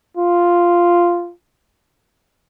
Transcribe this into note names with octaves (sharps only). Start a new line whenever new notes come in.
F4